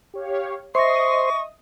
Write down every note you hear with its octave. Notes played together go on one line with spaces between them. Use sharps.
G4 C#5 F5
C5 D#5 E5 C6 C#6 D#6 A#6